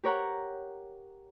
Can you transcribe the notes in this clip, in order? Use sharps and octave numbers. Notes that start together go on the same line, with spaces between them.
G4 A#4 C#5 F#5 A#5